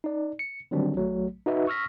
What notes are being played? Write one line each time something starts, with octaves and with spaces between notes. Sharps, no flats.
D#4 D5
C#7
D3 D#3 F#3 G3 C4 D4
A#1 F#3 A3
D#4 F#4 B4 D#5 E5
C#6 E6 F6 A#6 B6